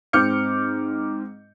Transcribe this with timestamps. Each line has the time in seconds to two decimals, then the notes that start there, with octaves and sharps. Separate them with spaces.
0.13 G#2 C4 D6 F6 G6 C#7